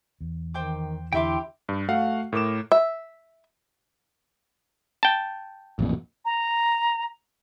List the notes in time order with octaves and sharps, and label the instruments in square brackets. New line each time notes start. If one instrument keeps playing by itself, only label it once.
[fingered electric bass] E2
[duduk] D#3 [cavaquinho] C5 G5 D6
[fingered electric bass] E2 D3 [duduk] E4 [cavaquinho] G4 E5 D6 [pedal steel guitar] G5 C6
[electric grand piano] G2
A3 F#4 F5 F#5
A2 A#4 D6 E7
[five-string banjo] E5
[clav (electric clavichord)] G5 A5
[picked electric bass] A1 F2 A#2
[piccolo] A#5